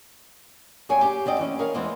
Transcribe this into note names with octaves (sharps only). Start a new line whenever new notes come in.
F#2 G3 G#4 C#5 G5 G#5
G4 G#4
F#2 C4 D5 D#5 G5
E3 C#4
G#4 A#4 C#5 F5
E2 E3 G#3 C4 C5